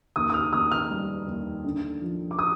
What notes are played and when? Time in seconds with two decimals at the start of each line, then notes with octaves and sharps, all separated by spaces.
0.16 D#2 D#6
0.30 D#6
0.34 F6
0.53 D#2 D#6
0.71 F6
0.90 G3
1.27 D#2
1.64 D3
2.02 F3
2.31 D6
2.39 D#6